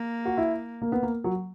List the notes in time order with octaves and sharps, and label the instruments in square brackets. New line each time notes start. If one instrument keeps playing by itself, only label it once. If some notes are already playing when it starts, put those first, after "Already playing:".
Already playing: [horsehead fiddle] A#3
[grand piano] F#4
E4
A#3
B3
A#3
F#3